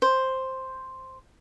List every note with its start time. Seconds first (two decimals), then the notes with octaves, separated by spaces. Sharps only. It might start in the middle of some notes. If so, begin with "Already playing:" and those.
0.02 C5